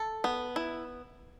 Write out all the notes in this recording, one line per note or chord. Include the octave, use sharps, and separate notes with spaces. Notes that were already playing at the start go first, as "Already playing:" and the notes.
Already playing: A4
B3
E4